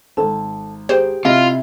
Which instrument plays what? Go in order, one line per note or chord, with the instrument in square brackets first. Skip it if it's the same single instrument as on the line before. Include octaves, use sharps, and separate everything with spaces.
[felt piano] G#1 [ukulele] A4
[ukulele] G4 G#4 [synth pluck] C5
[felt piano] C3 E4 [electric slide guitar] F4 [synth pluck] D#5